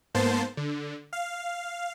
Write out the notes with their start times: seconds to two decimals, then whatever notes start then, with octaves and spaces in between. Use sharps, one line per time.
0.15 G#2 A#3 B3 C5 A5 C6
0.57 D3
1.13 F5